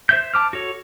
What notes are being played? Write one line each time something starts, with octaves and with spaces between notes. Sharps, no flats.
C5 E5 G6
A5 D6 F6
F#4 A4 C#5